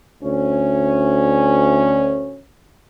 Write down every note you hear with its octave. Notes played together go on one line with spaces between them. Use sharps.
D2 C#4